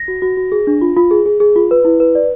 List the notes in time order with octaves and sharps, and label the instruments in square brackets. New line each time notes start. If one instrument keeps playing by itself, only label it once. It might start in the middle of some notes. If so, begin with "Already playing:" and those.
Already playing: [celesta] A#6
F#4
F#4
F#4
G#4
D4
F4
F4
G#4
G#4
G#4
F4
B4
E4
B4
D5